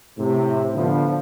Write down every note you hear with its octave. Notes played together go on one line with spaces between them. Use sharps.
A2 C3
D3 F3 B3 D4